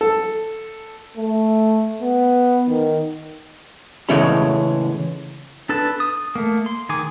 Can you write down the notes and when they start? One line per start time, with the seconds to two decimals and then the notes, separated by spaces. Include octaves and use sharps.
0.01 A4
1.17 A3
2.01 B3
2.68 D#3
4.09 C#3 E3 G#3 A3 C#4 B5
5.69 D4 A4 B4 A5
6.00 D#6
6.35 A3 A#3
6.66 C6
6.89 D#3 G#4 G#5 D6